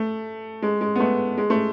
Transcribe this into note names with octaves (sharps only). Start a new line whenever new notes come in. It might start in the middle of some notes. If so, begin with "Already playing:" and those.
Already playing: A3
G#3
G#3
B3
A3
G#3
A3